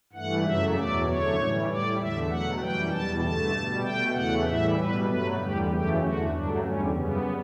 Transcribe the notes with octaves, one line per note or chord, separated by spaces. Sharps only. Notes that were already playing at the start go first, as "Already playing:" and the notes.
G2 E3 A3 F#5
F#2 C#3 F#3 A3 E5
E2 B2 F#3 D5
F#2 D3 A3 C#5
A2 E3 G3
A2 G3 D5
E2 D3 A3 E5
B2 F#3 A3 F#5
F#2 E3 G3 G5
E2 B2 G3 A5
G2 D3 A3 A5
B2 G3
B2 A3 G5
E2 C#3 E3 A3 F#5
A2 E3 G3 E5
B2 G3 B4
G2 F#3 A3 B4
E2 D3 G3 G4
F#2 C#3 E3 A3 G4
E2 D3 A3 F#4
G2 F#3 A3 D4
E2 D3 G3 C#4
F#2 C#3 G3 B3